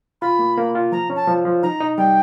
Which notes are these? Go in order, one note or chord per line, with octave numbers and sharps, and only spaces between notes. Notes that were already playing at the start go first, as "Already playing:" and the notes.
F4 B5
A#3
A#3
F4
F3 A#5
C#4
A5
F3
F3
D#4 A#5
D#4
G3 G5